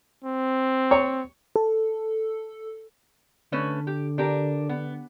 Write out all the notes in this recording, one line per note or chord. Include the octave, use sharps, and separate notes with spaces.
C4
C#5
A4
D3 A3 C#4 B4
G4
D4 G4 A#4
B3